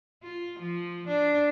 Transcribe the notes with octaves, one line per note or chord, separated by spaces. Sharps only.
F4
F3
D4